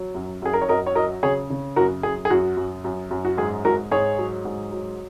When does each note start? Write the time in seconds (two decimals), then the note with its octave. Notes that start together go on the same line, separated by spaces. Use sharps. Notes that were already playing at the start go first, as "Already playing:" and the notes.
Already playing: F#3
0.15 F#2
0.42 F#2 G#4
0.53 A#4
0.61 C#5
0.68 F#2 A#4 D#5
0.87 C#5
0.95 F#3 A#4 D#5
1.23 C#3 G#4 C#5
1.50 C#3
1.76 F#2 F#4 A#4
2.03 F#2 G#4
2.25 G#4
2.30 F#2 F#4
2.57 F#2
2.84 F#2
3.11 F#2
3.25 F#4
3.38 G#2 G#4
3.65 G#2 F#4 A#4
3.91 G#2 G#4 C#5
4.18 F#3
4.45 G#2
4.72 F#3